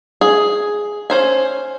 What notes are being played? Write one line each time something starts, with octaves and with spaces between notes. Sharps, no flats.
G#4
C#4 C5 G#5